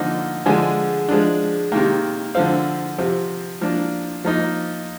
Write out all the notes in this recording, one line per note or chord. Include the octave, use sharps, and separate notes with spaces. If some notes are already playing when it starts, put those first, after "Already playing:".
Already playing: D3 F3 A#3 D#4
D3 F3 G#3 D4 G#5
F3 G#3 D4
C3 D#3 A#3 G5
D3 F3 C4 F5
C3 F3 C4
F3 A#3 D4
F3 A#3 D#4